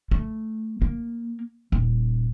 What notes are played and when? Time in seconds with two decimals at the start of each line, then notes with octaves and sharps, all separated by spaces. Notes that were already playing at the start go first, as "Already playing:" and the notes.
0.11 A3
0.82 A#3
1.72 D#1